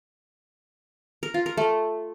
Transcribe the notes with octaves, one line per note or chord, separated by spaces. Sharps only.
A#4
F4
A#4
A3